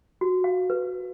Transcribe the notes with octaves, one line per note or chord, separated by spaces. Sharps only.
F#4
F5
B4